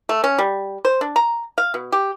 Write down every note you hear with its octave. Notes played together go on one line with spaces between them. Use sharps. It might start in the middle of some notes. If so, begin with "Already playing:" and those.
A3
C#4
G3
C5
D4
A#5
F5
B2
G4